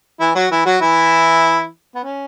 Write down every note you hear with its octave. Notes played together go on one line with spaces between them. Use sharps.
E3 E4
F#3 F#4
E3 E4
F#3 F#4
E3 E4
B3
C#4